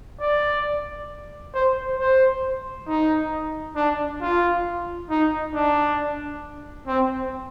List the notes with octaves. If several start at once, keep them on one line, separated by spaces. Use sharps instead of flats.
D5
C5
C5
D#4
D4
F4
D#4
D4
C4